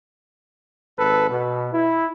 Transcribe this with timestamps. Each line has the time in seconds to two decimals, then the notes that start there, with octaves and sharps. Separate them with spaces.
0.98 G#1 A4 B4
1.29 B2
1.72 E4